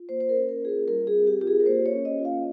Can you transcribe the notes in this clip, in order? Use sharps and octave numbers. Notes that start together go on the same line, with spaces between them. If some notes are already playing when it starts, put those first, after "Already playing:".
Already playing: F4
A#3 C5
C5
A#4
C#4
A#4
F4 G#4
A#4
G3 A#4
G#4
C4
G4
F4 G4
G#4
A#4
A#3 C5
C#5
C#4
D#5
F4
F5